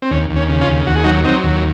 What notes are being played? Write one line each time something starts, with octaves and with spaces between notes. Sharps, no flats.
C4
D#2 C#4
D#2
C#4
C#3
C#4 F4
D#2
D#2 F#4
G#4
F#3 D#4 F#4
F#3 C4 D#4
D#2